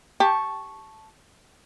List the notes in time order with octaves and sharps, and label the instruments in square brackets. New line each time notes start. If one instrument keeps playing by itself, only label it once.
[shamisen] G4 [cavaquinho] A5 C#6